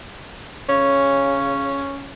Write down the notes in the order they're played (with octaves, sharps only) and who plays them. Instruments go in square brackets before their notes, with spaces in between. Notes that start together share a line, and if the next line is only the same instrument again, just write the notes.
[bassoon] C#3 [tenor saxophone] C#4